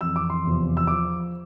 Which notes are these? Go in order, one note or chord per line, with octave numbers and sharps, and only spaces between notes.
F2 E3 E6
D6
C6
E2 C3 F3
E6
F3 D6